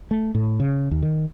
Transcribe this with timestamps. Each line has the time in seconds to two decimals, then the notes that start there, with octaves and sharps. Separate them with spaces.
0.11 A3
0.35 A2
0.60 C#3
0.91 D#2
1.02 D#3